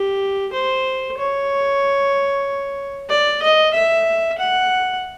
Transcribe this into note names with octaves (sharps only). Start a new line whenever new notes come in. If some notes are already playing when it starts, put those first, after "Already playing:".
Already playing: G4
C5
C#5
D5
D#5
E5
F#5